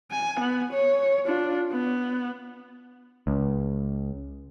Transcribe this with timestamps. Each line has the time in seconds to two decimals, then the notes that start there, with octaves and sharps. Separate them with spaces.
0.12 G#5
0.40 B3
0.72 C#5
1.26 D4 F4
1.71 B3
3.27 C#2